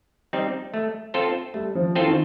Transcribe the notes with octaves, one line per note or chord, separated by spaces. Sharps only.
G3 C4 D#4
A3
C4 F4 A4 C5
G3 A3
F3
E3 C4 F4 A4 C5
D#3